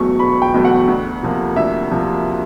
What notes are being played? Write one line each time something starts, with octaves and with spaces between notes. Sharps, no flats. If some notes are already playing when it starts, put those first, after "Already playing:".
Already playing: E1 E2 B2 F#3 A3 C#6
E1 B5
G5
E2 B2 F#3 A3
F#5
D2
C3 F3 A#3
D2 E5
C3 F3 A#3